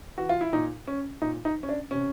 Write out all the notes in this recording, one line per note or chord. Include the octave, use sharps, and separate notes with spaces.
E3 F#4
F4
E4
A#2 D#4
C#4
A#2 D#4
D#4
C#4
D4
C3 C#4